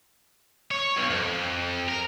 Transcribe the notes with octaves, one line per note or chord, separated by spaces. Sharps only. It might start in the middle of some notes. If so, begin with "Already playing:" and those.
C#5
B1
F2
A#4